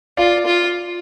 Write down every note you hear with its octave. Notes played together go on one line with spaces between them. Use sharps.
F4 D5 F5
F4